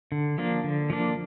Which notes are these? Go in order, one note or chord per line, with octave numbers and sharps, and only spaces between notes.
D3
F3 A#3 D4
D3
F3 A#3 D4